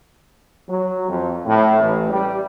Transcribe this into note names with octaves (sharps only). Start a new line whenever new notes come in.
F#3
F2
A2
A1
G3